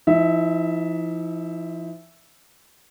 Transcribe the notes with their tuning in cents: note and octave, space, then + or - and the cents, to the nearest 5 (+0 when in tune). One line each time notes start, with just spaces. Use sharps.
F3 -40 D#4 +40 E5 +0